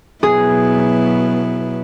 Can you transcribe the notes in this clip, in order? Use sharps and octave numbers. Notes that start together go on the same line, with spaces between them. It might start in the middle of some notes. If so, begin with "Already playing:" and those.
B2 F#3 B3 E4 G#4